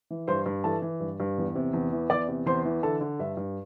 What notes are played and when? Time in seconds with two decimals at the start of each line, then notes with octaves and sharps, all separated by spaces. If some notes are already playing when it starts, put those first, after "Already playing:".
0.10 E3
0.28 G2 C5 C6
0.46 G2
0.64 E3 A4 A5
0.82 E3
1.00 G2
1.20 G2
1.38 E2
1.55 C3
1.73 E2
1.93 E3
2.10 E2 D5 D6
2.28 C3
2.46 E2 C5 C6
2.65 E3
2.83 D3 A4 A5
3.01 D3
3.19 G2 E5
3.37 G2